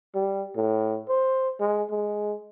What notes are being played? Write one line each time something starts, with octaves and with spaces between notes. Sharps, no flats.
G3
A2
C5
G#3
G#3